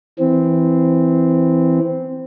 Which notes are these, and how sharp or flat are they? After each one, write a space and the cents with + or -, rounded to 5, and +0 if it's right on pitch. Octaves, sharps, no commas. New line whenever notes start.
E3 +0 C4 -10